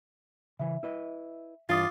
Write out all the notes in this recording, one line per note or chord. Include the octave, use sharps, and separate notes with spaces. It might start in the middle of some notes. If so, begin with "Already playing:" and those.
C#3 E3 E5
E4 B4 D#5
G2 E3 D4 F4 D6 D#6 A6